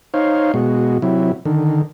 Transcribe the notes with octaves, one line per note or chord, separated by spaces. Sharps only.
D#4 C5 C#5 F5
B2 G#3 F#4
C3 F#3 E4
D3 D#3